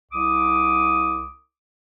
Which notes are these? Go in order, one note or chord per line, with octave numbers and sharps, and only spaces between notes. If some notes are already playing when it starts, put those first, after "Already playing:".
C2 D6 D#6